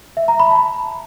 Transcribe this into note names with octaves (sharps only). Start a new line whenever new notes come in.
E5
A#5
B5
A5